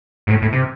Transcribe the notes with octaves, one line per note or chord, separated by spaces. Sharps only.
G#2
A2
A2
C3